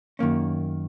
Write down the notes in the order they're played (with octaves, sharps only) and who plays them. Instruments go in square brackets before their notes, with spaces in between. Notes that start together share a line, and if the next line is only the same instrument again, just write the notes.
[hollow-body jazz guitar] F#2 D#3 A#3 C#4